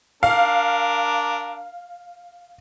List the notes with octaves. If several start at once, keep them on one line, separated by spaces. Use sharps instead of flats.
D4 A#4 F5